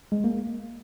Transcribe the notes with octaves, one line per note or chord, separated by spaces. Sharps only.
G#3
A#3